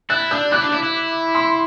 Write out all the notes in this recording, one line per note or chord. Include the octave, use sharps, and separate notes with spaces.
E4 F#6 A6
A6
D4 E6 G6
E4 D6 F#6
D4
E4
E4
C6 E6